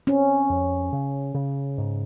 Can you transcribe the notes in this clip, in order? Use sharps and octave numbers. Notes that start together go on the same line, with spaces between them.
C4 C#4
F2
C#3
C#3
G#2